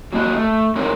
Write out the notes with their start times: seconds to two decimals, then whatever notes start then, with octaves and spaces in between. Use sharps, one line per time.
0.13 F#3 A#3 D#5
0.33 A3
0.75 G#3 C4 D#4 A#4 C#5